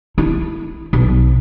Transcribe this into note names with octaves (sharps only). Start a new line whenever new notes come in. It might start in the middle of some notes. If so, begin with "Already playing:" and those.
E4
B1